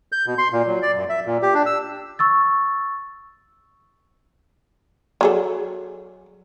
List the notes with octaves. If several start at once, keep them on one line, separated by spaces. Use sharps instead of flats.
G6
B2
C6
A#2
F#3
D5
F#2
E5
A#2
G4
D4
E6
C#6 E6 A6
F#3 G#4 A4